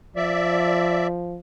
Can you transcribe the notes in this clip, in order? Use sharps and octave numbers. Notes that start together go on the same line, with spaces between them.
F3 D5 E5